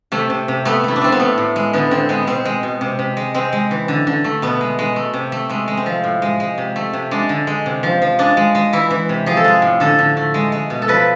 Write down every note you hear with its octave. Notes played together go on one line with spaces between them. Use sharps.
C3 A3
C3
C3
A3 B3
A3 E4
D4
A3 C4
B3
A2 A3
A2
G#3
D3 B3
D3 C4
G#3 B3
B2 C4
G#3
B2
C3
C3
G#3
G#3 C4
G#3
E3
D3
D3
A3
B2 B3
G#3
G#3
A3
C3
A3
G#3 A3
G#3
C4
F3
A2
G#3
G#3
C3
A3
C3
G#3 D4
D3
G#3
C3
F3
F3
G#3 D4
G#3
G#3
E3 E4
E3
C3
F3 G#4
A4
G#3 G#4
A2
D3 A4
D3
A3
G#3
G#3
B2
A4
F3 B4